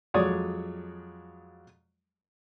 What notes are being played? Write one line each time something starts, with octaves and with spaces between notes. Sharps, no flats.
F2 F#3 G#3 C#5 D5 D#6